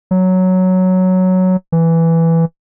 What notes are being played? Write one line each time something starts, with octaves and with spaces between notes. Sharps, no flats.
F#3
E3